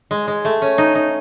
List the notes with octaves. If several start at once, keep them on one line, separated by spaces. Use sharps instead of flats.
G#3
G#3
A3
C#4
D#4
D#4